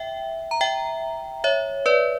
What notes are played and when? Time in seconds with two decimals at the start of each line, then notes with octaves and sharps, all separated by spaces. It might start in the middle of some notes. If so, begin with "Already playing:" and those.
Already playing: E5 G5
0.51 A#5
0.61 E5 G5
1.44 C#5 E5
1.86 B4 D5